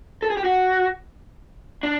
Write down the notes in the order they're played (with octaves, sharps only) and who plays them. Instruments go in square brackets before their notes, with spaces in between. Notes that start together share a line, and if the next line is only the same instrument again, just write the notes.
[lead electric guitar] A4
G#4
G4
F#4
D4